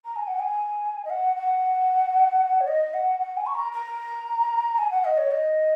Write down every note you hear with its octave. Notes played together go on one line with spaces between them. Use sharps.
A#5
G#5
F#5
G#5
D#5
F#5
F#5
C#5
D#5
F#5
F#5
G#5
C#6
A#5
A#5
G#5
F#5
D#5
C#5
D#5